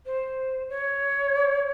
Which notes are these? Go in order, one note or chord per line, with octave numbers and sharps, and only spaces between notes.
C5
C#5